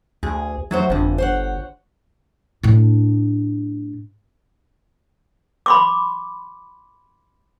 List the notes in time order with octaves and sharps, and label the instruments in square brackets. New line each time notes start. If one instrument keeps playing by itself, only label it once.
[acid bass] D2 [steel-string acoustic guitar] G#4
[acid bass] F#3 [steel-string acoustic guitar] A3 F#4 C5
[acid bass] G1 [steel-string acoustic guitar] F2 D3
[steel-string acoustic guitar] C5 C#5 F#5
[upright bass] A2 D4
[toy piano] B5 C6 D6